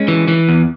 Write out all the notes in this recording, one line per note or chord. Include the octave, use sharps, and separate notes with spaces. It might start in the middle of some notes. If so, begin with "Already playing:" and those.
Already playing: G#3 C#4
E3
E3
E2